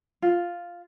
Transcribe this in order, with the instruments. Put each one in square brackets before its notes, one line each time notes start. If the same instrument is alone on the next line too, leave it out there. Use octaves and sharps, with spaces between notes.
[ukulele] F4